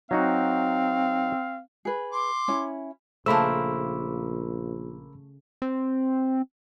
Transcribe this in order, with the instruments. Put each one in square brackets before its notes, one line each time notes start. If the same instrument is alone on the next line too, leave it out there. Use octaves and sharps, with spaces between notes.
[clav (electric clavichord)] F#3 D#4 F#4 [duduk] C4 [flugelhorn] F5
[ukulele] G#4 B4
[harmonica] C6 D6
[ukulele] C#4 E4
[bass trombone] A#1 [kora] C#3 A3 [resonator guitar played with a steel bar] A#3 C5 [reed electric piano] B5 E6
[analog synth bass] C4